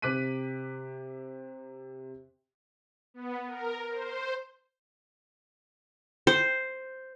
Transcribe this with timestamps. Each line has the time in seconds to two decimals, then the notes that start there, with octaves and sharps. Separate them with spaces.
0.02 C3 D6 F#6 B6 D#7
3.14 B3
3.48 A#4
3.90 C5
6.27 C5